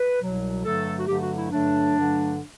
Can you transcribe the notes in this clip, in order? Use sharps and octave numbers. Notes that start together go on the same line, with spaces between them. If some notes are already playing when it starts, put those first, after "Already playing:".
Already playing: B4
C2 B2 F#3
G2 D3 F#3 A3 A4
F#4
G2 D3 F#3 A3 G4
F#4
E4
G2 D3 F#3 A3 D4
G2 D3 F#3 A3